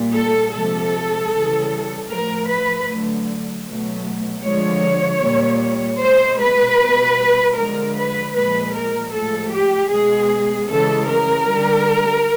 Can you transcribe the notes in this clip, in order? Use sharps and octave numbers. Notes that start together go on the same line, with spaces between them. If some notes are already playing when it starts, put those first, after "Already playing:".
Already playing: A#2 G3
A4
C3 F3 G#3 A4
C#3 E3 G3
A2 F3 A3 A#4
B4
D3 F#3 A3
B2 F#3 A3
D3 F3 G#3 C#5
A#2 G3
B2 G#3 C5
B4
B2 G3
D3 F3 G#3 A#4
B4
A#2 F3 G#3 B4
A#4
A2 F3 G#3 A4
G4
B2 G#3 G#4
C#3 E3 G#3 A4
A#4
D3 G3